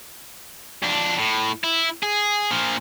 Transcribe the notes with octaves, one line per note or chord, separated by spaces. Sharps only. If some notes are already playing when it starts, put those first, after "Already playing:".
F2 D4
A2
E4
G#4
A#2 F3